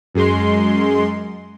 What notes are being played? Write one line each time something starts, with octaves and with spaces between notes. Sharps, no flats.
F#2 G#3 C6